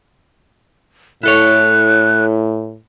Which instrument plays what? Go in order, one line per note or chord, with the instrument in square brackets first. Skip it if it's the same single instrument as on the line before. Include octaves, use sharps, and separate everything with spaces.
[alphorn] A2 [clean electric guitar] E4 A4 C#5 [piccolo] F#6